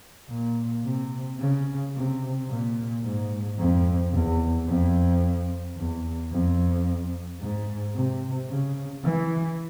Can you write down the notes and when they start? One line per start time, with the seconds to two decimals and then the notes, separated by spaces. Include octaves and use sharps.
0.29 A#2
0.84 C3
1.39 C#3
1.94 C3
2.48 A#2
3.03 G#2
3.58 F2
4.12 E2
4.67 F2
5.76 E2
6.31 F2
7.40 G#2
7.95 C3
8.48 C#3
9.04 E3